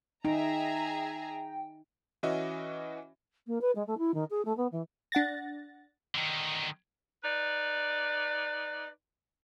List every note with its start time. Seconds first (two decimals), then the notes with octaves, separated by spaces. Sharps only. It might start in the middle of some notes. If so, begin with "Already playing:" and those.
0.25 D#4 G#4 E5 G5 A#5
2.23 E3 C#4 F#4 D#5 E5
3.47 A#3
3.61 B4
3.75 G#3
3.87 A3
3.98 E4
4.14 D#3
4.31 G#4
4.45 A3
4.57 B3
4.72 E3
5.12 D4 F#5 A6 A#6
6.15 D3 D#3
7.24 D#4 B4 D5